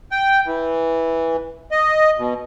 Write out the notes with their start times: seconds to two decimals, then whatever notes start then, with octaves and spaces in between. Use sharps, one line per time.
0.12 G5
0.46 E3
1.71 D#5
2.18 B2